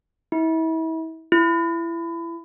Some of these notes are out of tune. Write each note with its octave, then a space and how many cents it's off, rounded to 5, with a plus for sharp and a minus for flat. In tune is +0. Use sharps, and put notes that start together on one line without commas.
E4 -35
E4 +25